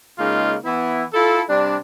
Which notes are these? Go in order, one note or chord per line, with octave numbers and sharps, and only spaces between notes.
C#3 G#3 A#3 D#4 F4
E3 B3 E4
E4 F4 A4
C3 G3 D4